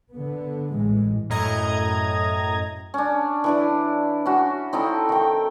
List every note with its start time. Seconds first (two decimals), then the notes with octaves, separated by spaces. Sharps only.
0.12 D3 B3
0.73 A1 E3 G#3
1.30 F#2 A2 D#5 A#5 G#6
2.94 C#4 D4
3.44 E3 D4 E4
4.26 C#4 F#4
4.73 C4 D#4 E4 A4
5.09 D#3 G5